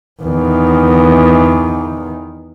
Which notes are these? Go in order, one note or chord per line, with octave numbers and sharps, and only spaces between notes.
E2 D#3